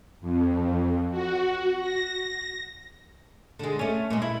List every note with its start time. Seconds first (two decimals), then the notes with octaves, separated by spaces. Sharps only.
0.21 F2
1.11 F#4
1.80 A#6
3.59 D3 G#3
3.79 A3 C#4
4.11 A#2 G#3
4.22 E4